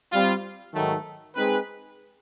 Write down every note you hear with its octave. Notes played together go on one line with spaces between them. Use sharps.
G3 C4 F4
G#2 D#3 F#3 A3
G#3 C4 D#4 G#4 B4